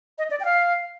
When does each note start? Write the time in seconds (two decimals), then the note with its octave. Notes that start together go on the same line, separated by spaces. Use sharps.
0.18 D#5
0.31 D5
0.40 G5
0.45 F5